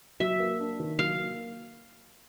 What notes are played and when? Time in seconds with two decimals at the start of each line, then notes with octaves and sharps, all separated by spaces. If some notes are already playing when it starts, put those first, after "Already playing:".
0.20 F#3 E5
0.40 A#3
0.60 D4
0.80 D#3
0.98 F#3 F5
1.19 A#3